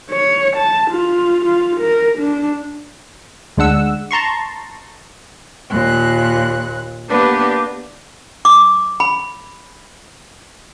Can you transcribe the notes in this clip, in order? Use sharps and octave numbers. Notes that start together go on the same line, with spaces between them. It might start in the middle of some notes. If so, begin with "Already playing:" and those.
C#5
A5
F4
F4
A#4
D4
D2 G#3 D4 F#5 E6
A5 A#5 C6 C#6
D#2 A#2 F#6
A#3 B3 D4 G4 B4
D6
B5